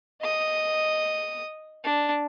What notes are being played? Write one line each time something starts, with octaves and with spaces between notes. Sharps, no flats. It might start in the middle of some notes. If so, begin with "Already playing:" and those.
D#5 D#6
D4